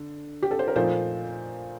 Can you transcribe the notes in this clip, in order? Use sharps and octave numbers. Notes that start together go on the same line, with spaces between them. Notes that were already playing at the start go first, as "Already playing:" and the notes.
Already playing: D3
G4
A4
C5
A#4
A#2 F3 A3 D#4 C5